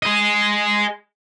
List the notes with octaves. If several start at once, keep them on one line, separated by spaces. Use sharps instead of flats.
G#4 D#5